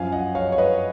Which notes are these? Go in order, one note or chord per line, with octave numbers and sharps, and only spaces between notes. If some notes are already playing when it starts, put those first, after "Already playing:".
Already playing: F#2 F3 F5 G#5
D#5 F#5
C#5 F5
C#5
B4 D#5